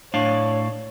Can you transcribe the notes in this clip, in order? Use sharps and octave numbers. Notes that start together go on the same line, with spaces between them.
A2 D4 C#5 F5